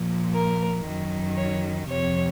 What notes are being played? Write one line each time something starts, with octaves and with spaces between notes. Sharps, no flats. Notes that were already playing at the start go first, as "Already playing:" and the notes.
Already playing: A#2 F3
A#4
F#2 D#3 F#3
C#5
F2 C3 F3 C#5